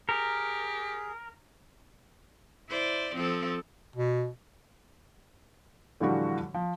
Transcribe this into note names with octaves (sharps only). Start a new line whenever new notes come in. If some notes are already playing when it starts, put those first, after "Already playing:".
G4 G#4 A#4
E4 C5 D5
F3 C4 A4
B2
A2 D3 E3 F3 G3 F#4
F3